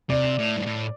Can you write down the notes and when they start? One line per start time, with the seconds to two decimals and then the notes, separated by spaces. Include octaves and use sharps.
0.10 C3 D5
0.39 A2
0.57 G2
0.67 A2